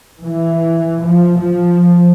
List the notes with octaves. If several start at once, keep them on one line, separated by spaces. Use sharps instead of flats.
E3
F3
F3